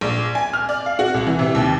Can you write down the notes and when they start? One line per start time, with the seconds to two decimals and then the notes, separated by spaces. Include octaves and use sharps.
0.01 A#1
0.35 G#5
0.53 F6
0.69 D5
0.86 F5
0.99 F#4
1.14 C2
1.27 E3
1.39 C3
1.55 D#2